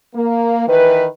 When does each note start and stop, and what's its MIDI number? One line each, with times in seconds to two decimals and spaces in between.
0.15 0.65 58
0.68 1.06 51
0.68 1.06 52
0.68 1.06 71